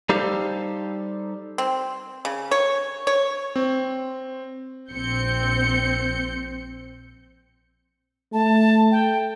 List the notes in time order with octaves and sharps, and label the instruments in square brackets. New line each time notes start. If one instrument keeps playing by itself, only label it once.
[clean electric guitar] G3 D#4 G4 A4 C5 F5
[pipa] C4
C#3
C#5
C#5
[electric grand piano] C4
[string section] A#1 C4 G6 C#7
[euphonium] A3 [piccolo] A5
[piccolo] G5